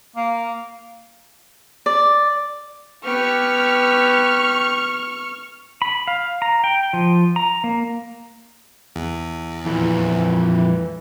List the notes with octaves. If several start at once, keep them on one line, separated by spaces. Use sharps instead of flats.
A#3
D5
B3 G4 C#6 F6
B5
F5
A#5
G5
F3
A#5
A#3
E2
F2 A#2 E3